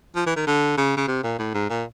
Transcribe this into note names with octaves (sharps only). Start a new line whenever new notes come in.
F3
E3
D#3
D3
C#3
C#3
C3
A#2
A2
G#2
A#2